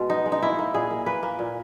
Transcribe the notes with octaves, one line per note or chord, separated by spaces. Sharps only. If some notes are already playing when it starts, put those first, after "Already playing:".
Already playing: B2 G#3
B3 D#4
G#3
D#4
A#3 E4
A#3
A#2 G#4
A#3
A#3 B4
A#3
A#2